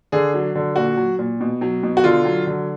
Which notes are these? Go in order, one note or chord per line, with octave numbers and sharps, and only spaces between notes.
D3 G#4
F#3
D3
A#2 F#4
F#3
A#2
B2
F#3
B2
F#4
D3 F4
F#3
D3